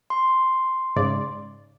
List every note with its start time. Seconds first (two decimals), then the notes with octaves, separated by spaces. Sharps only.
0.10 C6
0.96 G#2 C#3 D5